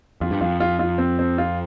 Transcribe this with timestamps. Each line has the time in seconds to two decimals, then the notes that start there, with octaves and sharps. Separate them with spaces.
0.21 F2 F4
0.31 G2
0.41 F2 F4
0.60 F4
0.79 F4
0.98 C4
1.19 C4
1.38 F4